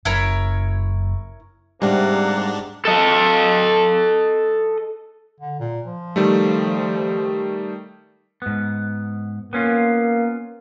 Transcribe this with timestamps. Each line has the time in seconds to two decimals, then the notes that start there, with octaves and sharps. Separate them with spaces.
0.05 F#1 E4 A#4 C#5
1.82 G#2 C3 G3 A#3 D4 F#5
2.85 A4 D#5
5.40 D3
5.60 A#2
5.86 F3
6.16 D#3 G3 A3
8.42 G#2 B3
9.53 A#3 B3 C#4 F4